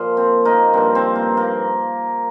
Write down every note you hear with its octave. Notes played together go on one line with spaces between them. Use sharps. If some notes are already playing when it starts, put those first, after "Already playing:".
Already playing: A#2 F3
C4
A#3 D#4
G2 F3 C4
C4
A#3
A#3